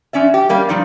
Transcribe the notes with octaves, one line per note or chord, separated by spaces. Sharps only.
F2 C#4 D5 E5
G4
G3 A#3 C#4
G2 F3 D#4 D5